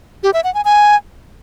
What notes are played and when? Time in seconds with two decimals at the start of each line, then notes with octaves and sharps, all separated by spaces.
0.23 G4
0.34 E5
0.44 F#5
0.54 G#5
0.65 G#5